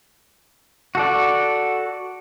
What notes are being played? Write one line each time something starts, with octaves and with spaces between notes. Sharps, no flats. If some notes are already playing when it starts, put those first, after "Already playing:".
F#4 A4 D5